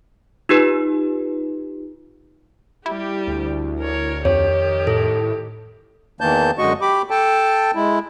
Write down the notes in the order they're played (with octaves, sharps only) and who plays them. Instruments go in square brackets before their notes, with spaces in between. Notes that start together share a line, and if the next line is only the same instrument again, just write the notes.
[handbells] D#4 F4 G4 B4
[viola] G3 G4 [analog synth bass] E4
[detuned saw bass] D2
[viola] A#4 C#5
[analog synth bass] F2 [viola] D#3 G4 [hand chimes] C#5
[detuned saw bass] A2 [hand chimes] A4
[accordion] E2 D#3 E3 A#3 A5 G6
F#2 D3 G#3 F#4 D#5 C#6
G4 B5 D6
A4 G5 A5
G#3 E4